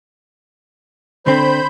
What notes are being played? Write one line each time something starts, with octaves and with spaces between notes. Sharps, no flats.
D3 C4 C5 B5 G6